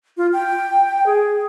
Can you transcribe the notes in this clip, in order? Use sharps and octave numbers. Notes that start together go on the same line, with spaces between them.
F4
G5
G#4